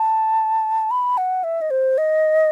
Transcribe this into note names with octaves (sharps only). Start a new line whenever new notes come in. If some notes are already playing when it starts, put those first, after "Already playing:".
Already playing: A5
B5
F#5
E5
D#5
C5
D#5